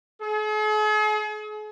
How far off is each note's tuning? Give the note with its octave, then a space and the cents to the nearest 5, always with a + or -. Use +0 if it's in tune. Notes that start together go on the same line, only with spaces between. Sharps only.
G#4 +45